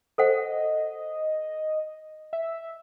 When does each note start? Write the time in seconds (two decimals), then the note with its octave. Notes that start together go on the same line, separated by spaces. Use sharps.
0.18 A4 C5 D#5 F#5
2.33 E5